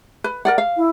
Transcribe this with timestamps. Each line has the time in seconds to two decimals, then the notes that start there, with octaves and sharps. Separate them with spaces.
0.24 B4
0.45 A#4 D5 F#5
0.58 F5
0.77 E4